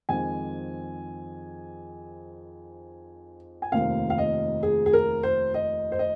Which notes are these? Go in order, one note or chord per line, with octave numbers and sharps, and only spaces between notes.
F2 D#3 G#3 C4 G#5
G#5
F1 D#2 D#3 C4 F5
F5
D#5
G#4
G#4
A#4
C5
D#5
C5
D#5